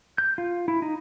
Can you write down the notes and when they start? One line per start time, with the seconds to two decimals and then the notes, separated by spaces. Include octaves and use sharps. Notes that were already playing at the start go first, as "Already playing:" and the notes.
0.18 G6
0.38 F4
0.68 E4
0.82 D#4